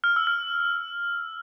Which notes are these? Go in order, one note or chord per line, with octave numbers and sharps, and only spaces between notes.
F6
E6
F6